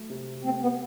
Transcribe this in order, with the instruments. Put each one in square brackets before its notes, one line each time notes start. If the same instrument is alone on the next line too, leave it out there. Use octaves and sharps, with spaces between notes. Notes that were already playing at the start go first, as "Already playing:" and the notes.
Already playing: [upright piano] F#3 A3
C3
[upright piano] A3 [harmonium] C4
[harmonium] B3